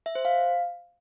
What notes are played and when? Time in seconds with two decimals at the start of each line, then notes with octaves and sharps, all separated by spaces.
0.06 E5
0.15 C5
0.25 F5